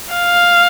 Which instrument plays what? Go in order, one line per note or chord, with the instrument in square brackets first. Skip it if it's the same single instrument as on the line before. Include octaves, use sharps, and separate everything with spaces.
[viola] F5